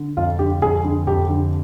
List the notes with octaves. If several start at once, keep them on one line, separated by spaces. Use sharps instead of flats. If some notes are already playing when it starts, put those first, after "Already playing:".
Already playing: D3
F2 F4
D3 G4
F2 G#4
D3
F2 G4
D3